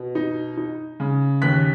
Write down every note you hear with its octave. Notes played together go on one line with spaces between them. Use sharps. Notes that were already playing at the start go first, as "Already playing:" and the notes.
Already playing: B2
D#4
D#4
C#3
D#2 F#6 B6